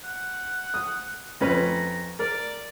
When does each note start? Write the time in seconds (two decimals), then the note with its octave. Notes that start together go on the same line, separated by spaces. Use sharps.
0.04 F#5
0.74 D#6
1.41 F2 C#4 B4 A#5
2.19 A#4 D5